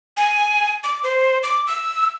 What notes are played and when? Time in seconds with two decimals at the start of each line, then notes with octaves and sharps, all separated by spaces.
0.17 G#5
0.84 D6
1.03 C5
1.43 D6
1.67 E6